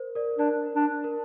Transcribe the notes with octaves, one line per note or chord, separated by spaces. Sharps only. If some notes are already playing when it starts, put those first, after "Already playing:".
Already playing: A#4 C5
A#4 D5
D4 A#4 D5
D4
A#4